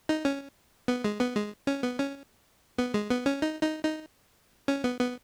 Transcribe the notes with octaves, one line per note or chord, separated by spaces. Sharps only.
D#4
C#4
B3
G#3
B3
G#3
C#4
B3
C#4
B3
G#3
B3
C#4
D#4
D#4
D#4
C#4
B3
B3